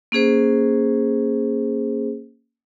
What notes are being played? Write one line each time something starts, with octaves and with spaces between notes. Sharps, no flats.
A#3 C#4 G#4 C5